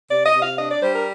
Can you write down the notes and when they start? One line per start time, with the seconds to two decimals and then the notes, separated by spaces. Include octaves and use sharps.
0.09 C3 D5
0.26 D#5
0.34 C3
0.41 F5
0.58 D4 D#5
0.71 D5
0.82 G3 C5
0.95 A#4